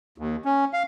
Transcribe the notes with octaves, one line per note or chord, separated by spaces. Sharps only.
D#2
C#4
F5